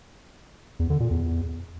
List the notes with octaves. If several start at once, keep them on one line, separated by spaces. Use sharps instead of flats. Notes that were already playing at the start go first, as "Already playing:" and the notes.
E2
D3
A#2
E2